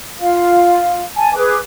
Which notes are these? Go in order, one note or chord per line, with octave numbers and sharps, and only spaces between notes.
F4 F5
G#5 A5
G#4 B4 D6